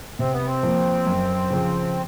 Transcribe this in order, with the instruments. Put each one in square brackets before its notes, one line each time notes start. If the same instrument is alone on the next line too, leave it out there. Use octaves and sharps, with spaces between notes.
[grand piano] C3 [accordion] C4
[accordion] B3
C4
[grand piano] F3 A#3
F#2
C#3 F3